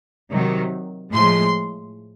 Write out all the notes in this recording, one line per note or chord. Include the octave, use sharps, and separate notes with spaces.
C3 D#3 F#3
A2 F3 G#3 C6